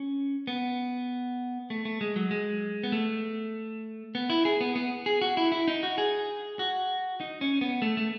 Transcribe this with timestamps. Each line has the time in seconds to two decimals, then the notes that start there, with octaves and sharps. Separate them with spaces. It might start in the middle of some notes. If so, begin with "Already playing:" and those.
Already playing: C#4
0.47 B3
1.70 A3
1.85 A3
2.01 G#3
2.16 F#3
2.31 G#3
2.84 B3
2.92 A3
4.15 B3
4.30 E4
4.45 G#4
4.61 B3
4.76 B3
5.06 G#4
5.22 F#4
5.37 E4
5.52 E4
5.68 D#4
5.83 F#4
5.98 G#4
6.59 F#4
7.20 D#4
7.41 C#4
7.61 B3
7.82 A3
7.97 A3